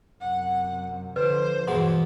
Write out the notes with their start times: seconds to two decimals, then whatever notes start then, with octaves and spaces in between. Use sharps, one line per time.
0.21 F#2 C3 F#5
1.16 D3 F3 B4 C5
1.68 E2 G2 B2 G#4 F#5 C6